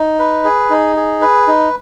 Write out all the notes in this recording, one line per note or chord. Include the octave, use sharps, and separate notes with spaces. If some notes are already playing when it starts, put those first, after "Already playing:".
Already playing: D#4
B4
G#4
D#4
G#4
B4
D#4